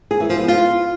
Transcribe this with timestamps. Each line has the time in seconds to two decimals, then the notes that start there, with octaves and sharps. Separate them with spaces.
0.11 G#4
0.20 E3
0.29 F3
0.39 B3
0.48 F4